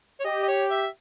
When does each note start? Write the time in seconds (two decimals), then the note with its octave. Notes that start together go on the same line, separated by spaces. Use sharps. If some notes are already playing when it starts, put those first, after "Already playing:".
0.20 C#5
0.25 G4 D#5
0.43 D#5
0.48 C#5
0.71 E5